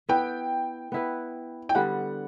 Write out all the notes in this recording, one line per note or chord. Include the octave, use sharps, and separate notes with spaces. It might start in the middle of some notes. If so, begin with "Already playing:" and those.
B3 E4 B4 G5
B3 E4 B4
G5
D3 G3 B3 F#5